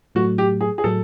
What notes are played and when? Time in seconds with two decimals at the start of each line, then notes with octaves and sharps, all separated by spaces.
0.15 A2 F#3 A3 F#4
0.38 G4
0.61 G#4
0.78 G#4
0.84 A2 F#3 A3 A4